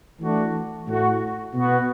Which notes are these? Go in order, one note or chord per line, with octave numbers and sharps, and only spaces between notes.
E3 A3 D4 F#4
A2 A3 F#4
B2 B3 F#4